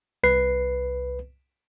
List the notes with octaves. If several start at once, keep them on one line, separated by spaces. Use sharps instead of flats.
C2 B4 C7